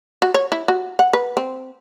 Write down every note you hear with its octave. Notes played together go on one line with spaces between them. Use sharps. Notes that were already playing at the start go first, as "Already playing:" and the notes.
F#4
C#5
E4
F#4
F#5
B4
C4